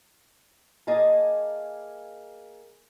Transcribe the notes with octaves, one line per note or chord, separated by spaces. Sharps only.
A#3 G#4 D#5 F5 A5